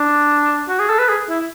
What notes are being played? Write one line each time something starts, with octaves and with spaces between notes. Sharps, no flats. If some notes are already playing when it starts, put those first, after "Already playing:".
Already playing: D4
F#4
G#4
A4
B4
G#4
E4